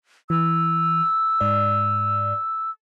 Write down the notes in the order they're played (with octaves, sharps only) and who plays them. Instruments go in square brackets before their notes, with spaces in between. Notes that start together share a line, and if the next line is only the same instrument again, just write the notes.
[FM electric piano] E3 [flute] E6
[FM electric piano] G#2 D5